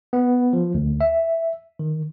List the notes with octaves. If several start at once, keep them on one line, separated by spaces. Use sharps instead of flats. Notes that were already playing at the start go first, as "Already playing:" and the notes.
B3
F3
D2
E5
D#3